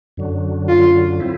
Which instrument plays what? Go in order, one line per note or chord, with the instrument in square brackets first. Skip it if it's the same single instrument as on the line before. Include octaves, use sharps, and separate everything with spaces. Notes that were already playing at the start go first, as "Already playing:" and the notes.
[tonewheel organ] F#2 D3 F#3
[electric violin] F4
[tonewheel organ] C4 E4